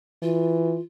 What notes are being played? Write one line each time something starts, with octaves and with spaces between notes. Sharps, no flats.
E3 F4